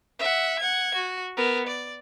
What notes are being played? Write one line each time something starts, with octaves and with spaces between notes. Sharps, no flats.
E5 F#5
F#5 G#6
F#4
B3 A#4
D5